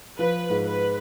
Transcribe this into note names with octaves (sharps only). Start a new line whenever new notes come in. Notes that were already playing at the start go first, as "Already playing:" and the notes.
F3 B4
G#2
B4